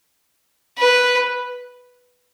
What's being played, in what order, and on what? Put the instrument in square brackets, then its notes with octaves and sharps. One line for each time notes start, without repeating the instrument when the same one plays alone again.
[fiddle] B4